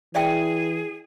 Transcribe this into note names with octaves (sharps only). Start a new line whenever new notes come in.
E3 G#4 D5 E5 G5